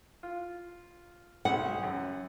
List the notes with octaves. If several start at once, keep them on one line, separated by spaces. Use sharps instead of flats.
F4
B1 F#5
F#2